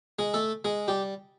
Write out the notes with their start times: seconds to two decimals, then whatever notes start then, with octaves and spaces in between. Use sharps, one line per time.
0.19 G#3 G#4
0.34 A3 A4
0.65 G#3 G#4
0.88 G3 G4